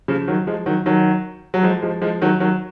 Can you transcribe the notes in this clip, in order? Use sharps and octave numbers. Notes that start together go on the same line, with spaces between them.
C#3 F3
D#3 F#3
F3 G#3
D#3 F#3
D#3 F#3
F#3
F3 G#3
F3 G#3
F3 G#3
D#3 F#3
D#3 F#3